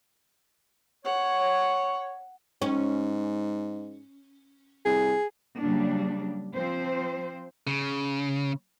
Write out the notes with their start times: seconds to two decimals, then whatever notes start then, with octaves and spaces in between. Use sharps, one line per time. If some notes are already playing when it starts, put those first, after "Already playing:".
1.05 C#5 F#5
2.62 G#2 C#4
4.85 C2 G#4
5.60 C#3 F#3 G3 A#3 D4
6.54 F3 C4 C5
7.67 C#3